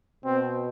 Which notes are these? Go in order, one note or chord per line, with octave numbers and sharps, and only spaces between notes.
B2 C4